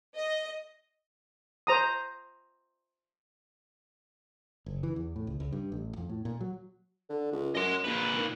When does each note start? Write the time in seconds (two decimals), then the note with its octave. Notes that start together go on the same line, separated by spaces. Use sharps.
0.16 D#5
1.67 C5 A#5 D#6
4.66 F#1
4.83 E3
4.96 E2
5.16 A2
5.27 C#2
5.40 C#2
5.53 G2
5.72 A1
5.97 F2
6.09 A2
6.25 A#2
6.41 F#3
7.09 D3
7.32 C#2
7.55 F#2 D#5 C6
7.84 A#1 A#2 B4
8.16 D#3